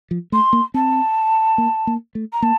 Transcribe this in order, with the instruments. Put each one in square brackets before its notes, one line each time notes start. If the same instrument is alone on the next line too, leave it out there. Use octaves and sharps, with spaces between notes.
[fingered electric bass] F3
[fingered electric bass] A3 [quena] C6
[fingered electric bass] A#3
[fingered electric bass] C4 [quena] A5
[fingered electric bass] A#3
A#3
A3
[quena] A#5
[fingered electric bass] A#3 [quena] A5